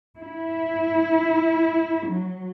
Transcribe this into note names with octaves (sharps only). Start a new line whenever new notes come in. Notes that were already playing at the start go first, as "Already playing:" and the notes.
E4
F#3